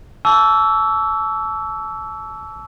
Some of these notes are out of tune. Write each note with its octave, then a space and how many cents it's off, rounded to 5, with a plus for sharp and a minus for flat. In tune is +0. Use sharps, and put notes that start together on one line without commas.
A5 -25 C#6 +45 E6 +0